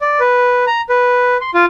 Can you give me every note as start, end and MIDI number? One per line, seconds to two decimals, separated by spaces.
0.01 0.20 74
0.20 0.65 71
0.67 0.81 82
0.89 1.37 71
1.41 1.51 84
1.54 1.65 65